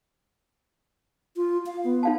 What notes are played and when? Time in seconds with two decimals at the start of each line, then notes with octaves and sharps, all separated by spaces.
1.36 F4
1.66 F5
1.84 B3
2.03 D#4 F5 A5